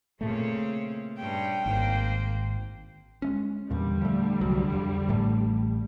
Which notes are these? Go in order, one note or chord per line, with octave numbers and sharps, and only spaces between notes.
A#2 C#3 A3 C4 C#4
G2 C#4 C5 G5
G#1 A#3 C5
G#3 A3 C#4
E2 A#2 D3 G3
F3 A3
C2 F#3
F2
A1 A2 A3